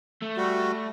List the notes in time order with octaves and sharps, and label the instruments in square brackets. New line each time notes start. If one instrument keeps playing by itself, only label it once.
[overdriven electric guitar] A3
[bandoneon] G3 F#4